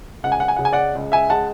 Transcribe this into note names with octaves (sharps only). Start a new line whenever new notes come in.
C#2 F#5
G#5
F#5
G#5
C#3 F#5
G#5
D5 F#5
C#2
E5 G#5
G#3 F#5 A5